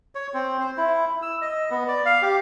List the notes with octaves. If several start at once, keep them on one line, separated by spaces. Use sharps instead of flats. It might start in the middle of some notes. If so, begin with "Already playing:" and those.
C#5
C4
C5
E4
E6
D#5
B3
D5
F5
G4